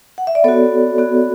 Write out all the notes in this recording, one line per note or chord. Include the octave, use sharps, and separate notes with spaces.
F#5
E5
D5
B3 F#4 A4 C#5
B3 F#4